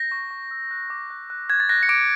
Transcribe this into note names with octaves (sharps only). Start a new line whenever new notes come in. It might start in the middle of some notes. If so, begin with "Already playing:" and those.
Already playing: G6 A#6
C#6
C#6
E6
F#6
D6
F#6
F#6
F#6 G#6
A6
F#6 A#6
C#7
D6 D7